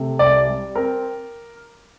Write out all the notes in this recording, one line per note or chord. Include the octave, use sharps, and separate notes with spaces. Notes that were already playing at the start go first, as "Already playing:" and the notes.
Already playing: C3 A3
C2 D5
G3
C4 A#4